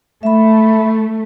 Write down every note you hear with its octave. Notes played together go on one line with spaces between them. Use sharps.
A3 E5 B5